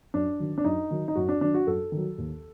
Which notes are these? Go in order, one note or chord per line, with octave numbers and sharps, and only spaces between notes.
F#2 D4
D#3 F#3
D4
F#2 D#4
D#3 F#3
D#4
F#2 F#4
D4
D#3 F#3 D4
F#4
F#2 A4
D#3
F#3
D#2